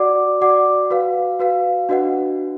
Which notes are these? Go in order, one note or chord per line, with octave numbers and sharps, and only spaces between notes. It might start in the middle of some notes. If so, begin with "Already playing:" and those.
Already playing: F#4 D5 F#5 D6
F#4 D5 F#5 D6
F#4 B4 F5
F#4 B4 F5
D4 F#4 B4 D#5 F#5